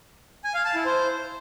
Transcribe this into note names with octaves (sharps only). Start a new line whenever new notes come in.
G#5
F5
A5
E4
C5